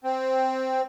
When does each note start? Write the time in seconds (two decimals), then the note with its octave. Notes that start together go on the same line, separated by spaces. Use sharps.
0.04 C4